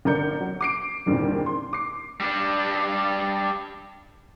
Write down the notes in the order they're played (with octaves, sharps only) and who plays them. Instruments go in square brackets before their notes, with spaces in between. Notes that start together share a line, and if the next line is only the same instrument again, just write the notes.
[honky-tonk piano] G1 D4 A#4 G6 C#7
F#3
D6 C7 D7
E2 G2 A#2 D3 D#3 C4
C6
D6 C7
[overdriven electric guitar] G3 D4